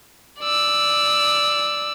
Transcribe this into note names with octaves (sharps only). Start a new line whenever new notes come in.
D5 E6